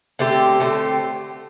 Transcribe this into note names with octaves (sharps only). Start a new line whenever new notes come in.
D3 A3 C4 G4
D3 A3 C4 G4